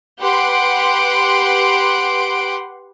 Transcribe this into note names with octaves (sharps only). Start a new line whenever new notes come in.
G4 B4 F#5 C6 D7